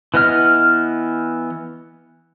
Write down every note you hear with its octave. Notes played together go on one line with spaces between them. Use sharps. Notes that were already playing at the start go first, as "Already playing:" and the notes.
E3 B3 D#5 F6